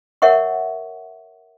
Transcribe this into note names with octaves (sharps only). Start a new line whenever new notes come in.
A#4 C#5 E5 F#5 C#6